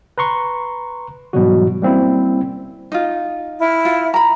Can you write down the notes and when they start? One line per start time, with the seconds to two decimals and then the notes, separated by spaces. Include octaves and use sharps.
0.18 B4 A#5 C6 C#6
1.33 G#2 B2 E3 F#3 G3 F#4
1.82 G3 A#3 C4 C#4 E4
2.92 D#4 F4
3.60 E4 F6
3.85 F4
4.14 A#5 B5